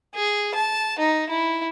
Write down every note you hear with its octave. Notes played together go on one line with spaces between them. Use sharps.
G#4
A5
D#4
E4